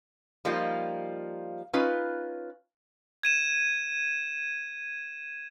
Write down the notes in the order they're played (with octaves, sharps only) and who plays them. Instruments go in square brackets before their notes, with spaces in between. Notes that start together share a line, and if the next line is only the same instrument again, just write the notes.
[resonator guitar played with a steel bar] F3 G3 A#3 D#4 F4
C#4 D#4 F4 B4
[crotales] G#6 D#7 E7